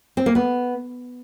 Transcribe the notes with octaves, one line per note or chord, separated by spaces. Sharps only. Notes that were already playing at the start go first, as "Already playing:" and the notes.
C4
A#3
B3